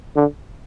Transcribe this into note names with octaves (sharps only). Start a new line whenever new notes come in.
D3